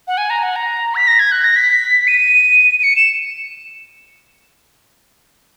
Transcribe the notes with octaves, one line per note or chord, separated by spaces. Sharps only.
F#5
G#5
A#5
F#5
A#5
B6
A#6
G#6
F#6
A#6
B6
D#7
D#7
C#7
E7